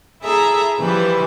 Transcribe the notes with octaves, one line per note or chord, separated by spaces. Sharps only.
E4 G#4 A4 E5 A#5
E3 F3 G3 E4 B4